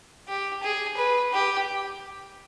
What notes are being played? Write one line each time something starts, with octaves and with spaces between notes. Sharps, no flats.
G4
G#4
B4
G4